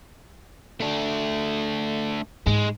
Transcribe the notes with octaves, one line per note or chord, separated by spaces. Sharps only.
A3 D4
G#2 G#3